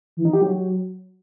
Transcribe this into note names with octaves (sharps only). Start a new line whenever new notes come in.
E3
D#4
G4
F#3